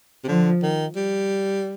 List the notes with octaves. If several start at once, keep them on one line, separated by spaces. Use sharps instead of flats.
C3
D3 F3
D#3
G3